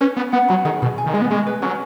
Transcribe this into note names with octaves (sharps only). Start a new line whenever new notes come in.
C#4 B4
B3 B4
B3 F#5
F#3 B5
D#3 G#4
B2 G#4
G#5
D#3
G#3 D#5
B3
G#3 C#4
B4
F#3 C#4